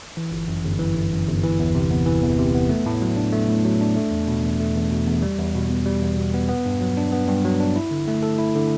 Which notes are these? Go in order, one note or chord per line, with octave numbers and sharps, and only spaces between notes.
E3
G1
F#2
G1
E3
G1
F#2
G1
E3
E2
C3
B3
E3
E2
C3
B3
A3
A2
F#3
D4
A3
A2
F#3
D4
A3
E2
B2
E2
A3
E2
B2
E2
G3
E2
B2
B3
G3
E2
B2
B3
B3
G2
F#3
D4
B3
G2
F#3
D4
E4
D3
A3
A4
E4
D3